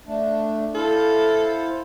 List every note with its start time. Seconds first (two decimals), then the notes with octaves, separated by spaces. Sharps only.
0.07 A3 D4
0.75 E4 A4 C5 F5